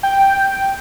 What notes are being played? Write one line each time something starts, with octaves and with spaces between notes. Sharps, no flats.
G5